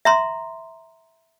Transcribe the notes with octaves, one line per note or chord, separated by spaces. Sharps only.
E5 A#5 C6